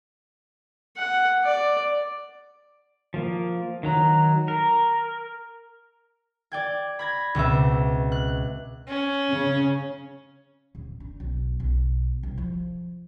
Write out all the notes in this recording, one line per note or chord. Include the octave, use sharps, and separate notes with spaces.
F#5
D5
F3 A#3
D#3 F#3 A#5
A#4
D5 G5 G#6
B5 G#6 A#6
C#2 B2 C4 E5
F#6
C#4
C#3
D1
D4
B1
B1
C2
F3